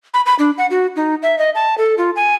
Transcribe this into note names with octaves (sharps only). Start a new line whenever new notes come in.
B5
B5
D4
F#5
F#4
D#4
E5
D#5
A5
A4
F4
G#5